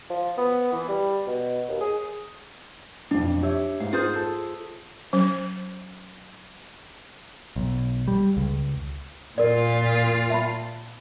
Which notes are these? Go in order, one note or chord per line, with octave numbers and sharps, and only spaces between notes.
F3
B3
E3
G3
B2
D#2
G#4
B1 F2 D4
G4 C#5 E5
G#2 F5
F4 G#4 C5
A4
F#3 C#4
B1
G3
C#2
A#2 F4 A#4 D5
E5 A5 B5